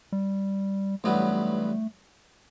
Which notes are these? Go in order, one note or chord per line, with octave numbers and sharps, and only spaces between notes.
G3
A1 G2 F#3 A3 B3